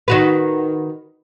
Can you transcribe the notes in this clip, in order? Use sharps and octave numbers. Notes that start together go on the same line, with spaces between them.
D#3 F#4 B4